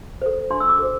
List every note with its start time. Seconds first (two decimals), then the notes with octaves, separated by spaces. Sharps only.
0.22 A4 C5
0.50 D4 C6
0.60 E6
0.69 D6
0.79 A4 C5